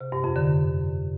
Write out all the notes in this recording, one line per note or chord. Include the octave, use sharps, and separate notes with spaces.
C3
G2
F2
D3